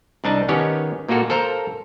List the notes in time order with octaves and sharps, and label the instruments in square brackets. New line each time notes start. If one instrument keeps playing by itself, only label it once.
[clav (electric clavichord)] C2 D4 D#4 A5
D#3 B3 C#4 G4 C#5
A#2 A#3 F4 F#4 A4
A4 A#4 C5 F5 A#5